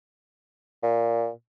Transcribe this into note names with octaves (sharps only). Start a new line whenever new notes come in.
A#2